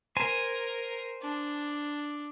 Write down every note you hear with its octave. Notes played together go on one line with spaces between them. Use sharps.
A#4 C5 G#5
D4